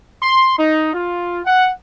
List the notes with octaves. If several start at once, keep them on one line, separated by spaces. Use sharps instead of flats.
C6
D#4
F4
F#5